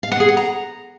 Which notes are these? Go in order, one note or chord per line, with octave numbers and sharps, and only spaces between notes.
F5
F#5
G#4
F#5
A#5